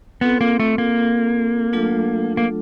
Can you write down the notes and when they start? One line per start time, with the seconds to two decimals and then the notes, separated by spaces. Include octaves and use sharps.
0.21 B3 C4 F4 A4
0.41 A#3
0.60 A3
0.78 A#3
1.73 F#3 A3 D4 F4 A4
2.37 A#3